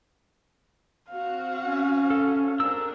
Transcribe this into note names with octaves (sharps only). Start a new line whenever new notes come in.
C4 F#4 F5
C#4
A4
G#3 C4 D4 A#4 E6